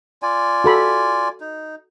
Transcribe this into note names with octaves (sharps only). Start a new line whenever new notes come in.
F4 D5 G#5
F#4 A4 B5
D#4